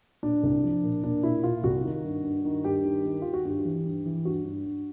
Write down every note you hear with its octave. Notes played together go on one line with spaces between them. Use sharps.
A#2 D4
C2
F3
A#2
A#2 D4
A#2 E4
A#2 F4
C2 F#4
D#3
G2
G2
D#3
G2 G4
D#3
D#3
D#3 F4
F#4
G2 G4
E3
G2
E3
G2 F#4
G2
G2